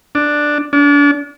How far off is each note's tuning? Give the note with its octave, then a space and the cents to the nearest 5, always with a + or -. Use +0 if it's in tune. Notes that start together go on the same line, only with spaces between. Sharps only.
D4 +5
D4 -35